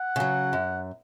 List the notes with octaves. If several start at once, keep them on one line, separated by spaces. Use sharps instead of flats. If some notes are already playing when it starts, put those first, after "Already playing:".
Already playing: F#5
C#3 F#3
F#2